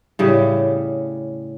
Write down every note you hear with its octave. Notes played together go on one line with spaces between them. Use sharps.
A2 C#3 G3